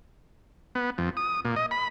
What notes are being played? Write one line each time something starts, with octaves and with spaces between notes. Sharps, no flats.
B3
F2
D#6
A#2
D#5
B5